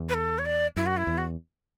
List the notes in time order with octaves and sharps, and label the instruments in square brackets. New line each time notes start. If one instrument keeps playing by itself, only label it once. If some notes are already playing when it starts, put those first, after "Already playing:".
Already playing: [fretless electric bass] E2
[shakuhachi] B4
A4
C#5
D5
[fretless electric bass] F#2 [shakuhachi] E4
[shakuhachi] F#4
E4
[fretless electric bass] E2
[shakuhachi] F#4